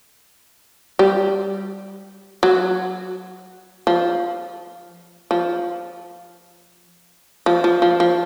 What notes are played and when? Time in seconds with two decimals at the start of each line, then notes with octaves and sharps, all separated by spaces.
0.99 G3
2.43 F#3
3.87 F3
5.31 F3
7.46 F3
7.64 F3
7.82 F3
8.00 F3